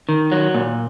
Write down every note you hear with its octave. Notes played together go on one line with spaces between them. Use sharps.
D#3
F#3
A#2